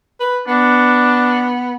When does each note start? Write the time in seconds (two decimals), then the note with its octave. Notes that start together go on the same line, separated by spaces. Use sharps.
0.20 B4
0.48 B3 D4